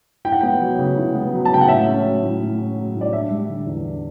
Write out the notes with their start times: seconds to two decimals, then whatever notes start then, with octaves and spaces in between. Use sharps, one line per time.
0.25 E4 G5
0.32 F#5
0.41 B3 G5
0.61 F#3
0.78 C#3
0.97 E4
1.15 B3
1.33 F#3
1.45 A5
1.51 C#3 G5
1.61 F#5
1.68 A2 E5
1.86 C#4
2.04 F#3
2.23 A2
2.41 A2
2.59 C#4
2.77 F#3
2.95 A2
3.01 D5
3.13 D4 E5
3.31 G3
3.49 D3
3.66 E2
3.85 D4